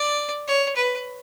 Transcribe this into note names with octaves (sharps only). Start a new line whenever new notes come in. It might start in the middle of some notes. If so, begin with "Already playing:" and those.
Already playing: D5
C#5
B4